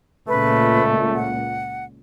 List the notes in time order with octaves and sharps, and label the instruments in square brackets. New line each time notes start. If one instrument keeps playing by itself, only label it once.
[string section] C#2 A#2 [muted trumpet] A3 [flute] B4
[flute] F#5